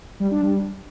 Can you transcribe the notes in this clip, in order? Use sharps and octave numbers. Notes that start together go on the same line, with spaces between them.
G3
D4
G3